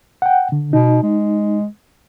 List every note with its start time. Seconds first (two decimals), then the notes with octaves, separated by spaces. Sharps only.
0.22 F#5 G5
0.52 D3
0.73 B2 D#4
1.03 G#3